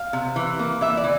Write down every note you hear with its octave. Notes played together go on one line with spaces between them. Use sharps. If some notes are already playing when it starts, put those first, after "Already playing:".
Already playing: F5
C3
E3
A#3
E3 E5
D5
E3